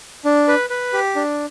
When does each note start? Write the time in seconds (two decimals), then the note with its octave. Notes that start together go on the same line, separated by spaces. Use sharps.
0.25 D4
0.48 B4
0.70 B4
0.93 G4
1.16 D4